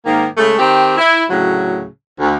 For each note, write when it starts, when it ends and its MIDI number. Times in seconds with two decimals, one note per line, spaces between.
0.06 0.27 44
0.06 0.27 51
0.06 0.27 58
0.37 0.55 49
0.37 0.55 56
0.37 0.55 57
0.59 0.97 51
0.59 0.97 60
0.59 0.97 67
0.98 1.25 64
1.29 1.85 38
1.29 1.85 45
1.29 1.85 49
1.29 1.85 54
2.20 2.36 38